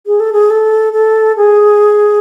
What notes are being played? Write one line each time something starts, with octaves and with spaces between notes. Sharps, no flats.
G#4
A4
G#4
A4
A4
G#4